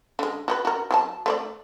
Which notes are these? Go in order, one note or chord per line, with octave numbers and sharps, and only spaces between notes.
D3 G#3
F#4 G4 B4
F#4 A#4
F#3 G4 A5
A3 C5 D5